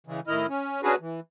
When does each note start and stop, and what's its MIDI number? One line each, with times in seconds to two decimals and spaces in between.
0.07 0.20 49
0.07 0.20 52
0.07 0.20 56
0.27 0.46 45
0.27 0.46 51
0.27 0.46 64
0.27 0.46 75
0.27 0.46 89
0.49 0.82 61
0.83 0.95 61
0.83 0.95 62
0.83 0.95 66
0.83 0.95 68
0.83 0.95 71
1.01 1.20 52